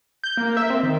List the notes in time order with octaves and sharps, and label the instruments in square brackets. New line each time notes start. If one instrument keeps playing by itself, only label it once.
[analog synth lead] G6
A#3
E5
C4
D#3